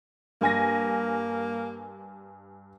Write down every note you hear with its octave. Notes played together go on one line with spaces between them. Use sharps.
G2 A#3 G#5 A#6